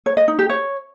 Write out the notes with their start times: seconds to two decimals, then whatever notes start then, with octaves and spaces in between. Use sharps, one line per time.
0.06 C#5
0.17 D#5
0.28 D#4
0.39 G4
0.49 C#5